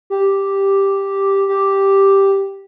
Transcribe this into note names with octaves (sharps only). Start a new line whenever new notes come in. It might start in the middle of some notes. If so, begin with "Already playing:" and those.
G4
G4